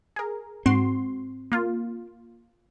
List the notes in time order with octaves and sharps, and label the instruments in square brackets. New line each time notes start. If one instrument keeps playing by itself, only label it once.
[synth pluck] G#4 A#4
[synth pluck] G#2 F#4 C6 [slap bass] C4
[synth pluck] A#3 F4